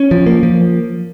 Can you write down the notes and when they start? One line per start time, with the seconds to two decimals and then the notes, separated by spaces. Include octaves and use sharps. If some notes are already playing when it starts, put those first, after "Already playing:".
Already playing: C#4
0.11 F3
0.26 A#3
0.43 F3